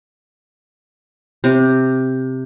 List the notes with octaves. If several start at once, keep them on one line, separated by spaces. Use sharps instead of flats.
C3